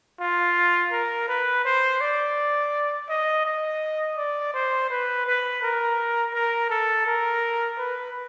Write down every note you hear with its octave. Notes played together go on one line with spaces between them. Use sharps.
F4
A#4
B4
C5
D5
D#5
D#5
D5
C5
B4
B4
A#4
A#4
A4
A#4
B4